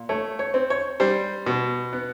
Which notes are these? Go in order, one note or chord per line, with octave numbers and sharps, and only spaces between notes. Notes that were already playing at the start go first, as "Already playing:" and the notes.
Already playing: A#2
A3 C#5
C#5
C4
C#5
G3 C5
B2
B3